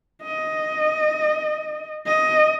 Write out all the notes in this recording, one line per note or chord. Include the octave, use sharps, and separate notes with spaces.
D#5
D#5